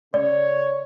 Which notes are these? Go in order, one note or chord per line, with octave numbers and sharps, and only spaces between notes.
C#3 C#5 D5